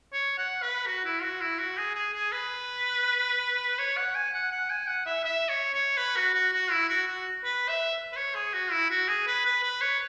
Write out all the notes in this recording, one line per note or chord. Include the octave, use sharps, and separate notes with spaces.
C#5
F#5
B4
F#4
E4
F#4
E4
F#4
G#4
G#4
G#4
B4
C#5
F#5
G#5
F#5
F#5
G#5
F#5
E5
E5
C#5
C#5
B4
F#4
F#4
F#4
E4
F#4
F#4
B4
E5
B4
C#5
G#4
F#4
E4
F#4
G#4
B4
B4
B4
C#5